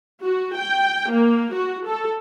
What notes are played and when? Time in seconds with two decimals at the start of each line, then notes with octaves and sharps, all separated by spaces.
0.23 F#4
0.57 G5
1.12 A#3
1.55 F#4
1.87 A4